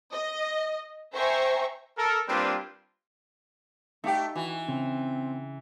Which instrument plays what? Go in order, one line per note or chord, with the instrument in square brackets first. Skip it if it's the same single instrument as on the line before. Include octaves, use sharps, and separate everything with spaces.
[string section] D#5
C5 E5 G5 G#5 A#5 C#6
[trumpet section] A4 A#4
G3 A#3 C4 D4 F4 B4
[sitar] A3 G4 [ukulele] D#4 F5 G5
[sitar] E3 [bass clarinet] F#4
[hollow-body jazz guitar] C#3 [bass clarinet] C4